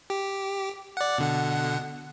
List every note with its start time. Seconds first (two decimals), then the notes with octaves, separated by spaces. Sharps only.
0.10 G4
0.97 D5 F#5
1.18 B2 D3 F#5